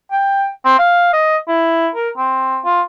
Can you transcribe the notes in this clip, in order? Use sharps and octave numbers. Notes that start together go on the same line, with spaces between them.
G5
C4
F5
D#5
E4
A#4
C4
F4